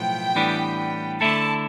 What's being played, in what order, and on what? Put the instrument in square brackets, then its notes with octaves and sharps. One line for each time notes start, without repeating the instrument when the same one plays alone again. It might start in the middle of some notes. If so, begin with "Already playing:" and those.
Already playing: [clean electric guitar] B1 A2 F3 B3 [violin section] G5
[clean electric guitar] A2 E3 G3 B3 D4
[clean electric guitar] D3 A3 E4 A4 [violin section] A5